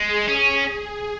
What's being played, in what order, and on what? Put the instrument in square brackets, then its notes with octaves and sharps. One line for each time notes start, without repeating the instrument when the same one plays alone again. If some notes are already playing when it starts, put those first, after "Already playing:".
Already playing: [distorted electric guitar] G#3 [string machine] G#4
[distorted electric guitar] C#4